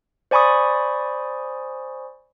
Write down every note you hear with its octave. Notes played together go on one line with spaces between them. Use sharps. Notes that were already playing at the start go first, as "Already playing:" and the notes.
C5 D5 G#5 B5 C#6 D#6